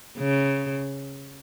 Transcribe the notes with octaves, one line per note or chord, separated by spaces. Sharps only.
C#3